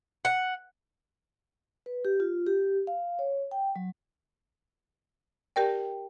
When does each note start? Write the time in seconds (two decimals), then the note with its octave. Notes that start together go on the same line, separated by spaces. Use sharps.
0.25 F#5
1.86 B4
2.05 G4
2.20 F4
2.46 G4
2.87 F5
3.19 C#5
3.51 G5
3.76 F#3
5.56 G4 A#4 D5 G5 A5